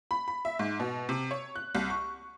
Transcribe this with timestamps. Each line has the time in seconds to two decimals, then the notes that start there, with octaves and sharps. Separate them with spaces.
0.11 B5
0.28 B5
0.45 E5
0.59 G#2
0.80 B2
1.09 C3
1.31 C#5
1.56 F#6
1.75 C2
1.90 C#6